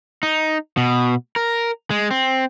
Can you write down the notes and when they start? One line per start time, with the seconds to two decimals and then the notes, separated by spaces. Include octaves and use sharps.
0.23 D#4
0.77 B2
1.36 A#4
1.91 G#3
2.11 C4